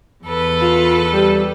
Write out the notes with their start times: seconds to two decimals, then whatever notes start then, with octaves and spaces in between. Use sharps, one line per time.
0.24 E2 A4 B4
0.61 F4
1.13 G3